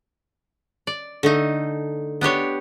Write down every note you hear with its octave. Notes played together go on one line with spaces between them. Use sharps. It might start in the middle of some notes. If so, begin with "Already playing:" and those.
D5
D3 A3 D#4
B3 D4 G4 C#5